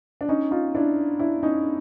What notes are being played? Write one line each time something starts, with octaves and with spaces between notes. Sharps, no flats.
D4
C#4 D#4
D#4 F4
D4 E4
D4 E4
C#4 D#4